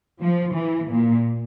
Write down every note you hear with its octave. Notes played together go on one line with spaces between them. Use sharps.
F3
E3
A#2